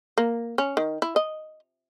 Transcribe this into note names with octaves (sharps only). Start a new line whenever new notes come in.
A#3
C#4
D#3
E4
D#5